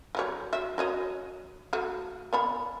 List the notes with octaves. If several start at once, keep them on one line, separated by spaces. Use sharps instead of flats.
F#3 G3 C#5
F#3 E5
F#4 C#5 D#5
A3 F#4
B3 C#5 B5